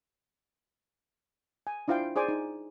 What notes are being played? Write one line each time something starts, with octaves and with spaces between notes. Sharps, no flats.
G#5
D4 E4 F4 C5 F5 G5
G#4 C5 D5 G#5 D6
D#4